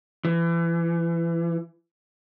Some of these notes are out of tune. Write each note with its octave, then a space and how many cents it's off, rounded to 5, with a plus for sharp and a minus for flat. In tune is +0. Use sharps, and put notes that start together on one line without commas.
E3 +30